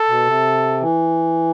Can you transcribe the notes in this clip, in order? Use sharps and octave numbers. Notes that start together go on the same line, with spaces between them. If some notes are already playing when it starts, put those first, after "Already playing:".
Already playing: A4
B2
C3
E3